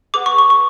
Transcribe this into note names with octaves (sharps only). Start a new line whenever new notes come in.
G#4 B4 F#5 D6
C#6
C#6
C#6